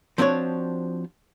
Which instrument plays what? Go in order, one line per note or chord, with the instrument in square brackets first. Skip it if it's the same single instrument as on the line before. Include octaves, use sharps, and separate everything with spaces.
[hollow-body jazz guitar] F3 C4 D4 F#4 C#5